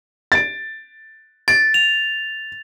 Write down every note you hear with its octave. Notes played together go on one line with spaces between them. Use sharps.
A6 D7
A6 D7
F7